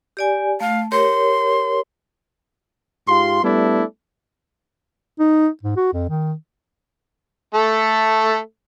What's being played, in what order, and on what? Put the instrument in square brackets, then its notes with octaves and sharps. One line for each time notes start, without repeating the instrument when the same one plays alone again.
[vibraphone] G4 D5 G#5
[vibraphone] A3 [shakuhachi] F5
[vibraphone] G4 A#4 C#5 [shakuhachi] C6
[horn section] G#2 F4 G4 C6
G3 A3 B3 D4 E4
[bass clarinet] D#4
G#2
F#4
F2
D#3
[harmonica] A3 A4